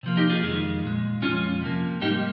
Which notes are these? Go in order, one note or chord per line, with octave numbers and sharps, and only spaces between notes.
C3 F3 A#3
D#4 G4
F4 G#4
F2 D#3 G#3
A#2 G#3
F2 C#3 G#3 C#4 F4
C3 F3 A#3
G#2 G3 A#3 D#4 G4